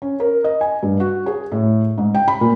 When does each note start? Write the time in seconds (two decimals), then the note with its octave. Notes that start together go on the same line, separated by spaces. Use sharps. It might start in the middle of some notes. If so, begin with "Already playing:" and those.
0.02 C#4
0.20 A#4
0.44 D#5
0.61 G#5
0.83 G2
1.00 F#4
1.26 G#4
1.52 A2
1.98 G#2
2.15 G5
2.28 B5
2.41 A#2